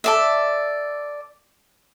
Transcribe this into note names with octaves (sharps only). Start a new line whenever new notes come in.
A4 D5 E5